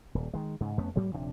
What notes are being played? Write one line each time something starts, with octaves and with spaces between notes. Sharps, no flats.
D#1
D#3 G#3
G#2 C#3
F2 A3 B3 C#4
G#2 F#3 G3 A#3
D#1 C3 F3 D4